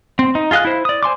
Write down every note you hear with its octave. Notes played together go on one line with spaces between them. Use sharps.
C4
D#4
F4 G#4 D#5 F5 F#6
E4 C5
D5 D#6
C5 G#5 C6 D6